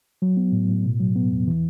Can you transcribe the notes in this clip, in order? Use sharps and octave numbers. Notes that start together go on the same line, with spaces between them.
F#3
B3
A2
A2
B2
F#3
B3
E2
E3